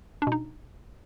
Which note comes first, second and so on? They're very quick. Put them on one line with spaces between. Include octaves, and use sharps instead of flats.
D4 B2 D#4